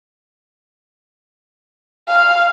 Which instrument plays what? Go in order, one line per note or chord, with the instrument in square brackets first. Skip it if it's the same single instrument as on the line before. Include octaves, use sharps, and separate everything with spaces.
[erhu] F5